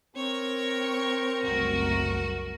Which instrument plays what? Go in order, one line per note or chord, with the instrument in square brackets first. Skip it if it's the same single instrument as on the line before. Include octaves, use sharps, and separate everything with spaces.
[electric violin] C4 [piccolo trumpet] A#4 [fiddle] C#5 C#6
[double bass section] F#1 C2 A3 [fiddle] F#4